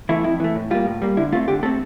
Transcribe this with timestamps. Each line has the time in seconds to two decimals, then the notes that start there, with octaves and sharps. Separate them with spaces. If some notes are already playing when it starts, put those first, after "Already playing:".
0.09 E3 A3 E4
0.24 F2 E4
0.40 E3 A3
0.56 A2
0.71 G3 A#3 F4
0.86 A2
1.02 G3 A#3
1.17 D3 E4
1.32 A3 F4
1.35 C4
1.48 D3 G4
1.63 A3 A4
1.65 C4